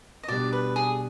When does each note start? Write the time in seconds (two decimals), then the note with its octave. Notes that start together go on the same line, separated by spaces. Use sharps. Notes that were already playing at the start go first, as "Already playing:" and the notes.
0.23 D#5
0.28 B2 G3 D4 D5
0.53 B4
0.76 G#4